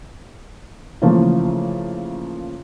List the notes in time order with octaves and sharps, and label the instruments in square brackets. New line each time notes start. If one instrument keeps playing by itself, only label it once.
[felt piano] C#3 E3 F3 A3 A#3